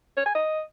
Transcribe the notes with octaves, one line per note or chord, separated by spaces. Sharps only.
C#5
G#5
D#5